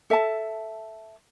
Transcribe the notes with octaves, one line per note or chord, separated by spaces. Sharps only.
A4 E5 A5